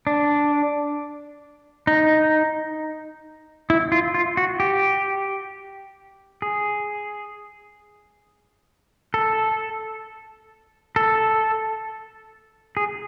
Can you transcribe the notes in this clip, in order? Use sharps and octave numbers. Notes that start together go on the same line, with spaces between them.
D4
D#4
E4
F4
F4
F#4
G4
G#4
A4
A4
G#4